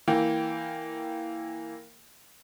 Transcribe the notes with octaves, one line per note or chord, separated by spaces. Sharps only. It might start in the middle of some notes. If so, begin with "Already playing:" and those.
E3 A#3 G5